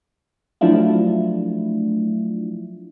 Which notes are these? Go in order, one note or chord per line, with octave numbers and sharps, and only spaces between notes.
F3 F#3 A3 D4 E4 F4